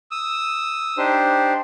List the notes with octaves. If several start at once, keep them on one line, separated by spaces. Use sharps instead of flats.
D#6 E6
D4 D#4 G4 C5